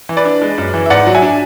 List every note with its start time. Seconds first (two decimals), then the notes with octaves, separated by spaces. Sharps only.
0.09 E3
0.17 B4 D5
0.25 D4
0.41 G#3
0.58 F#2
0.74 E3
0.86 E5
0.90 G#2 D5 F#5
1.07 F#3
1.15 E5 G#5
1.22 D4